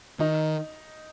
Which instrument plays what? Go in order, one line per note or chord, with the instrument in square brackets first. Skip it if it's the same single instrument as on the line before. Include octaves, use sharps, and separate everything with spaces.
[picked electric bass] D#3 [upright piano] D#4